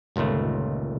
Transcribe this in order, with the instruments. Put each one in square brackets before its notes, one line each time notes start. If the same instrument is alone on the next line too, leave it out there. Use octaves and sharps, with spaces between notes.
[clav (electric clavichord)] G1 C#2 A#2 D#3 A3